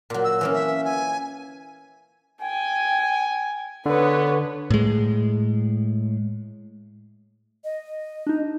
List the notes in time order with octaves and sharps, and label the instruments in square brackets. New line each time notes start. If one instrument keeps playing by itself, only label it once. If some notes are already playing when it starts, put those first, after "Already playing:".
[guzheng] A#2 F#3
[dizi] E6
[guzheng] E3 A#3 C#4
[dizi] E5
G#5
[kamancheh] G5 [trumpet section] G#5
[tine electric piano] D3 [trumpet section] B3 [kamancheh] B4 C#5
[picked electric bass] A2 G#3
[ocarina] D#5
[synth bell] D4 D#4